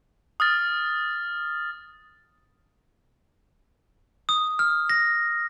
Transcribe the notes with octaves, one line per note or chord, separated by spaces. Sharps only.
D#6 F6 A6
D#6
F6
A#6